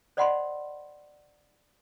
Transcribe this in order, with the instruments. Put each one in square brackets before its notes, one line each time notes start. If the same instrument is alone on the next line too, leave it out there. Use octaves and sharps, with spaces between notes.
[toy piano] C5 D5 D#5 F#5 B5 C6